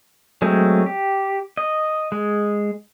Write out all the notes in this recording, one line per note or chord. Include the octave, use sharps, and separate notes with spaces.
F#3 G#3 A3 C4
G4
D#5
G#3